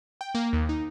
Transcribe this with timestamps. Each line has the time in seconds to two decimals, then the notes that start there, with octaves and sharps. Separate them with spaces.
0.21 G5
0.34 A#3
0.53 D#2
0.69 D#4